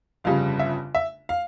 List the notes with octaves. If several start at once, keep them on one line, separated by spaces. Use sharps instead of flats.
G1 F2 C#3 G3 F5
E5
E5
F5